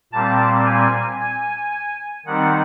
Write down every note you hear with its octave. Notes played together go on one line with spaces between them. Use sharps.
A#2 G3 C4 A5
G#5
G#5
D#3 G3 C4 D#4 F#5